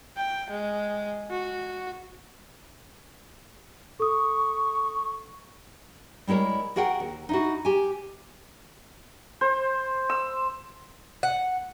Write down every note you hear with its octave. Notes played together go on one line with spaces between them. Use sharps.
G5
G#3
F#4
A4 C#6 D#6
G3 G#3 E4 A#4 C#5
F#4 G#4 A#4 F#5 G5
D#2
D#4 E4 F#4
G4 G#5
C5
E6
F#5